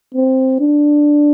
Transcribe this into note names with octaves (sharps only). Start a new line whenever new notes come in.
C4
D4